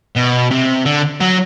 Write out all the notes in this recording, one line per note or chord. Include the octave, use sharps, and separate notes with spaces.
B2
C3
D3
F#3